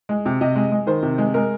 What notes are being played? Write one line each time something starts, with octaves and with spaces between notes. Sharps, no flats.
G#3
C3
C3 D#5
G#3
G#3
D#3 C5
C3
G#3
G#3 A#4